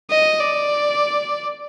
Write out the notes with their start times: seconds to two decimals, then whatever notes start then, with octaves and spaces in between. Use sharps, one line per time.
0.11 D#5
0.40 D5